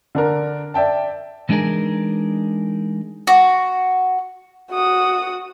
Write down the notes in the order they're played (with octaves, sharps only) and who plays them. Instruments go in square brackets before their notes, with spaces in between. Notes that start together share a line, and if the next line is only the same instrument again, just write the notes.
[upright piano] D3 D4 A#4
D5 E5 G5 A5
[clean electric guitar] E3 G#3 D4 D#4 G#4 A#4
[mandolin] F#4
[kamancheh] F#4 D#6